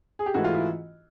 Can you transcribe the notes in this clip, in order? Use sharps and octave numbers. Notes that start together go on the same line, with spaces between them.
G#4
G4
G#2 E3 A3 F#4
F4
E4